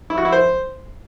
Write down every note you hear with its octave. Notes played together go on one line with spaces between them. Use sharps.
E4
F#4
E4
C5